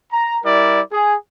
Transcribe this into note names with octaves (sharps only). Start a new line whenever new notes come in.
A#5
G3 E4 A#4 D5
G#4